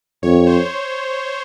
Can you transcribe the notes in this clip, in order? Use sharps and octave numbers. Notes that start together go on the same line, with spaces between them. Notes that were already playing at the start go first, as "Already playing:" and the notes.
F2 C#5
C5